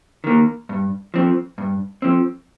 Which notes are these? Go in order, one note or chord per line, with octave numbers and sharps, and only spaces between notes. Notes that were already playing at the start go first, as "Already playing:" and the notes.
D#3 A#3
G2
F3 C4
G2
F3 C4